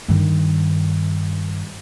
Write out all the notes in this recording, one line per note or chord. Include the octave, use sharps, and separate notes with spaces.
G2 D#3